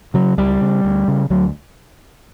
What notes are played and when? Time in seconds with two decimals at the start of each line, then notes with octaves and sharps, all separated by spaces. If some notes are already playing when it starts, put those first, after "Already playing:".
0.14 C#3 F#3
0.38 C#2 G3
0.61 C#3
0.85 D2
1.08 C#3
1.30 D2 F#3